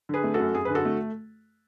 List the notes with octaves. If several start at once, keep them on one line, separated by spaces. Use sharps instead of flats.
D3 G#4 B4
A3
F#4 A4
F#2
F#2 G#4
D3 B4
F#4 A4
A3